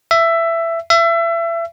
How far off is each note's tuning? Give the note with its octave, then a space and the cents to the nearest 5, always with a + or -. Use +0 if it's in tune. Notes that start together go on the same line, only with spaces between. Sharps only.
E5 +15
E5 +30